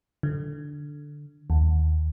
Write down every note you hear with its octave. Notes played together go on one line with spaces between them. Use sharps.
D3
D#2